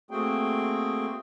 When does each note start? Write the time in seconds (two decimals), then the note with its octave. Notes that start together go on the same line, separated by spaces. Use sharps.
0.11 A3 A#3 C4 F#4 G#4 G5